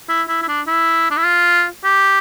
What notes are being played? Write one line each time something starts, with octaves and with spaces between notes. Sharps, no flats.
E4
E4
E4
D4
E4
D4
E4
F4
G4